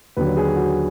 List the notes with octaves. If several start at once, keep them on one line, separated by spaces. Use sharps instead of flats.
D#2 D3 F#3 B4
G#4
F#4